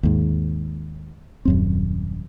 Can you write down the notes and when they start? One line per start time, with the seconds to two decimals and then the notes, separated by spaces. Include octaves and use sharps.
0.03 D#2 G#2
1.45 D#1 F#2 C4